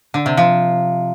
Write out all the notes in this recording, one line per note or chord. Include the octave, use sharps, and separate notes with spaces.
D3
C3
F3